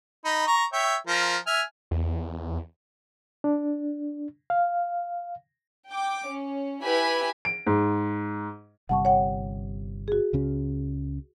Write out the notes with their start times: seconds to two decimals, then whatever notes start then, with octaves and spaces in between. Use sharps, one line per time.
0.25 D#4 B5
0.47 A#5 C#6
0.73 C#5 E5 G5
1.07 F3 A#4
1.47 E5 G#5 F6
1.91 E2
3.44 D4
4.50 F5
5.88 G5 D6
6.27 C#4
6.84 E4 G4 B4 G#5 B5
7.45 D7
7.67 G#2
8.89 G1 C3 G3 F#5 A5 C#6
9.05 C#5 F#5 G5
10.08 F#4 G#4
10.33 C#2 C#3 C#4